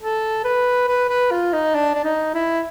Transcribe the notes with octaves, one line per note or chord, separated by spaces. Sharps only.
A4
B4
B4
B4
F4
D#4
D4
D4
D#4
E4